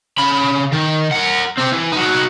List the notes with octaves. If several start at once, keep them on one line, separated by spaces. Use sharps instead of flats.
C#3 B5
D#3
A#4 F#5
C4 G4
E3
D#4 F#4